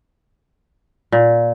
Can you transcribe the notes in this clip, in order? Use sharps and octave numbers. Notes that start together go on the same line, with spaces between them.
A#2